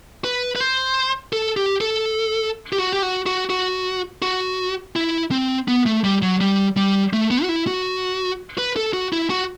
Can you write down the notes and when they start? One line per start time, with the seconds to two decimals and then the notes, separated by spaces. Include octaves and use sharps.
0.24 B4
0.56 B4
0.61 C5
1.33 A4
1.57 G4
1.81 A4
2.73 G4
2.78 F#4
2.93 G4
3.02 F#4
3.26 F#4
3.50 F#4
4.22 F#4
4.96 E4
5.31 C4
5.68 B3
5.86 A3
6.04 G3
6.22 F#3
6.41 G3
6.77 G3
7.13 A3
7.31 B3
7.43 F#4
7.49 E4
7.67 F#4
8.58 B4
8.76 A4
8.93 F#4
9.13 E4
9.30 F#4